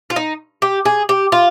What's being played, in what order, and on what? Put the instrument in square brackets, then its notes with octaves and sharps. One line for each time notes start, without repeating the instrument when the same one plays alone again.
[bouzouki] F4
D#4
G4
G#4
G4
F4